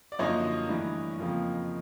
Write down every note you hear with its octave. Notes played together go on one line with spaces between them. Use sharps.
D5
F#2 D3 F3 A#3 D#4 C#5 D#5
G2 E3 A3 D4
F2 C#3 F3 A#3